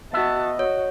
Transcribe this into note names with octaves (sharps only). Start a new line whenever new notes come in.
B3 F#4 D#5 E5 A5
F#4 C#5